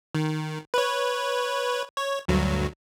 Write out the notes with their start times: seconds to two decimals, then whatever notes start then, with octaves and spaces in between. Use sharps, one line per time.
0.15 D#3
0.74 B4 C#5
1.97 C#5
2.28 D2 G2 F#3